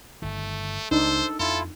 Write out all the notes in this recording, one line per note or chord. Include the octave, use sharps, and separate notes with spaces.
G1 D#3 A3
C#2 D4 D#4 A4 C5
F2 E4 F4 A4